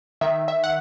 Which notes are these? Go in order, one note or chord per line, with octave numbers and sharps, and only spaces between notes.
D#3 E5
E5
F#5